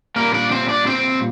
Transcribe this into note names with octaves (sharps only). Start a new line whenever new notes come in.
A#2 G3 A#3 A#4
D4 D5
C4 C5
D4 D5
C4 C5